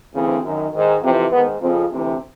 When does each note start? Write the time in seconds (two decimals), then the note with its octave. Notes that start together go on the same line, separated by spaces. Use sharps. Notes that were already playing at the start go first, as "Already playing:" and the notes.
0.14 D2 C#3 E3 C4
0.44 F#2 D#3
0.73 G#2 D#3
1.02 F2 C3 E3 C4
1.32 G#2 D#3 B3
1.61 F2 C#3 F3 C4
1.91 D2 C3 E3 C4